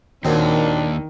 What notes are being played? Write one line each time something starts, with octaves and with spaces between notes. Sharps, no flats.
D#2 A#2 D#3 F#3 C4 D4